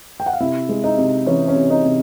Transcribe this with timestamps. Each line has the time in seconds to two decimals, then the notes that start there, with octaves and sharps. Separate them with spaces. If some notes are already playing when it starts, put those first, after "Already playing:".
0.20 G5
0.26 F#5
0.33 F5
0.40 C3 E4 E5
0.69 G#3
0.84 D#4 D#5
0.98 C3
1.27 E3 C#4 C#5
1.48 C#4 C#5
1.56 C3
1.70 D#4 D#5
1.85 C3